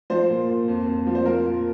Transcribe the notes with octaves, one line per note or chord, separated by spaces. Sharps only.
F3 C5
A#2
A#2
F2
F2
F3
C5
F3 A#4
A#2